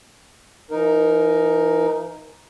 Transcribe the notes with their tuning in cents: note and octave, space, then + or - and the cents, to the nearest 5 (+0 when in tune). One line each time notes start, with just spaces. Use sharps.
E3 +40 D#4 +0 A#4 +0